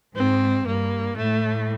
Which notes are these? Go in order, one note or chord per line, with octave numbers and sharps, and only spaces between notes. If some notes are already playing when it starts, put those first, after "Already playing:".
G#2 C4
G2 A#3
A2 A3